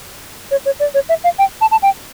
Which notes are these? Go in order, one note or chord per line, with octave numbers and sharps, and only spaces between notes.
C#5
C#5
D5
C#5
E5
F5
G5
A5
A5
G5